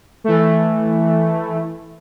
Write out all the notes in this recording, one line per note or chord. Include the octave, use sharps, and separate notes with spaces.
E3 A3